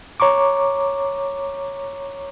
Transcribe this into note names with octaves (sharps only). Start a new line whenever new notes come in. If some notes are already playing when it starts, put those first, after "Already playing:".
C#5 A#5 C#6 D6